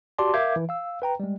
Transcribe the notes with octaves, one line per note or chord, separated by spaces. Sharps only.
F#4 G4 D5 A5 C6 D6
A#4 E5 F5 D6 G6 G#6
E3
F5 E6
B4 G5 A#5
G3 G#3